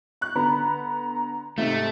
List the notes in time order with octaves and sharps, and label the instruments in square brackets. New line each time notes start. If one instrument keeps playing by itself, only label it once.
[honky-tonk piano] C#6 F#6
[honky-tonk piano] D3 B3 B5 [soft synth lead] A#5
[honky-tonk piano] G#2 C3 [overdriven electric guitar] A3